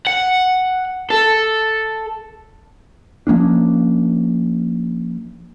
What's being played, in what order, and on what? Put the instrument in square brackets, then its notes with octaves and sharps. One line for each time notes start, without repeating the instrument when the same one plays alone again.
[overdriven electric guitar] F#5
A4
[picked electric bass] F3 A#3 C#4 D4